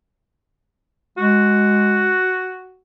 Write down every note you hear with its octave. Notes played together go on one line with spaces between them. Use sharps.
G#3 F#4